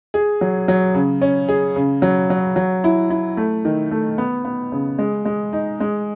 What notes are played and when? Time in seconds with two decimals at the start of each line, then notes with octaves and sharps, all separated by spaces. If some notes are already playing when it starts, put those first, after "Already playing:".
0.14 G#4
0.41 F#3
0.68 F#3
0.95 C#3
1.22 C#4
1.49 G#4
1.76 C#3
2.02 F#3
2.30 F#3
2.56 F#3
2.84 E4
3.10 E4
3.37 A3
3.65 D#3
3.91 A3
4.18 B3
4.45 B3
4.72 C#3
4.99 G#3
5.25 G#3
5.53 D#4
5.80 G#3